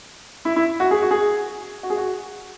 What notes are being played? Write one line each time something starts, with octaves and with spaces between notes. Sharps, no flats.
E4
E4
F#4
G#4
F#4
G#4
F#4
G#4
F#4